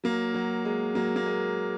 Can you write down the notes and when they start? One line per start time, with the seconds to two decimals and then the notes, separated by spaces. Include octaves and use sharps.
0.04 F#3 A#3
0.34 F#3
0.65 G#3
0.95 F#3 A#3
1.16 A#3
1.26 G#3